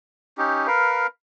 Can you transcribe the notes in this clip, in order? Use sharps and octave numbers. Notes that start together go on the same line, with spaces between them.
C#4 D#4 G4
A#4 B4 F5